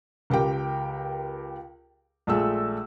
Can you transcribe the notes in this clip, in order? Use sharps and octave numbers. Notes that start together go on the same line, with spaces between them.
C#2 G4 A#4 G5
A#1 G#3 A3 E6